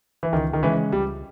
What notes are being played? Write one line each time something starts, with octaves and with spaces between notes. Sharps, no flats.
E3
C#2 D#3
D#3
C#3 E3 G#3 C#4
C#2 G3